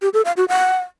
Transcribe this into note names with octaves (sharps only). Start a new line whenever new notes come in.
G4
A4
F5
F#4
F#5